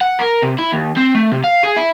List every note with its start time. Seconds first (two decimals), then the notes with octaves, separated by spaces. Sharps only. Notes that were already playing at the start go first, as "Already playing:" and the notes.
0.01 F#5
0.19 A#4
0.43 C3
0.59 E4
0.73 D#2
0.97 C4
1.15 A3
1.32 C3
1.44 F5
1.63 G#4
1.76 E4